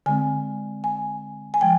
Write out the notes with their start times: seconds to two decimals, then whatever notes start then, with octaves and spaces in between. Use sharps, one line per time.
0.06 D3 G#3 C4 G#5
0.84 G#5
1.54 G#5
1.61 F3 G#3 G5